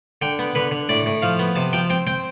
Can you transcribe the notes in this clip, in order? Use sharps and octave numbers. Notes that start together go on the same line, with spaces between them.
D3 G5
B3
D3 B4
D3
A2 D5
A2
F3 F5
B3
C3 A5
F3 G5
C4 G5
C4 G5